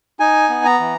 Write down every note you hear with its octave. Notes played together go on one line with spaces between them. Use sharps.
D#4 G#5
B3
A#5
E3